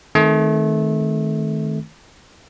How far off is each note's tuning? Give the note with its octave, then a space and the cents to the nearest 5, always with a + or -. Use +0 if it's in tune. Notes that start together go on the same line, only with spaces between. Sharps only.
D#3 +0 A3 -25 C4 +0